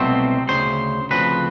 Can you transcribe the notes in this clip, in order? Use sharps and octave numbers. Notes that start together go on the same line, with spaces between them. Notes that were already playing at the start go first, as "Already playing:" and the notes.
Already playing: C2 B2 F#3 A3 C4 C5
D2 C#3 C5
D2 C#3 F3 C4 B4